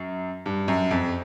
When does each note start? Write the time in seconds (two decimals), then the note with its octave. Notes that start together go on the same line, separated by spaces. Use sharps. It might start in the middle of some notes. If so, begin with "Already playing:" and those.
Already playing: F#2
0.46 G2
0.68 F#2
0.91 F2